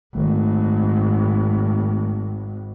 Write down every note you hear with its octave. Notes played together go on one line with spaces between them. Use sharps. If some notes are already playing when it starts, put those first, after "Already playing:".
G#1 D#3 A3